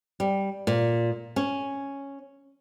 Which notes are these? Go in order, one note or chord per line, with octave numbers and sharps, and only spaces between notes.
G3
A#2
C#4